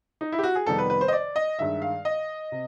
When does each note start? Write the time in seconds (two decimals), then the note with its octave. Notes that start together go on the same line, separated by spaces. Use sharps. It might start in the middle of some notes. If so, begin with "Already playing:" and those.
0.21 D#4
0.32 E4
0.39 G4
0.43 F#4
0.55 G#4
0.66 F2 C3 D#3 G3 B3 A4
0.78 B4
0.90 B4
1.01 C5
1.08 D#5
1.13 D5
1.36 D#5
1.59 G2 D#3 G#3 E5
1.82 F5
2.05 D#5
2.52 C3